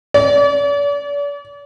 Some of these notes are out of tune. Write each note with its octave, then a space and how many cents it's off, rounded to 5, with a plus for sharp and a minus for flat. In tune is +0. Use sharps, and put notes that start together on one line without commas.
D5 -40